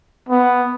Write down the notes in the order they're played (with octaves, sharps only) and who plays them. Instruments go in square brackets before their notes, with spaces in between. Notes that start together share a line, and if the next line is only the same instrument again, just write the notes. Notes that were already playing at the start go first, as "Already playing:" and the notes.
[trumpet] B3